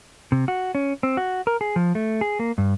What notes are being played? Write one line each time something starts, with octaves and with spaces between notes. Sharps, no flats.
C3
F#4
C#4
C4
F#4
A#4
G#4
F3
A3
G#4
A#3
G2